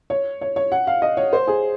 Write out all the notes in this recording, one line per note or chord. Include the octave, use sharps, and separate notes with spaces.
C#5
C#5
C#5
F#5
F5
D#5
C#5
C5
G#4